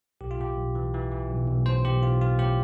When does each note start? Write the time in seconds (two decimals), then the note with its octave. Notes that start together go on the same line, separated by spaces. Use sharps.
0.21 B1 G4
0.31 F4
0.38 A2 G4
0.57 B1
0.75 E3
0.94 E3
1.12 E3
1.30 B1
1.48 B1
1.66 A2 C5
1.84 B1 G4
2.02 B1 F4
2.21 B1 F4
2.39 A2 G4